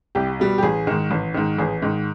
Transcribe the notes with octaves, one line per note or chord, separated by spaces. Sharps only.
C2 G4
B2 G3
G4
A1 G#4
G#2 D#3
A1
G#2 D#3
A1 G#4
G#2 D#3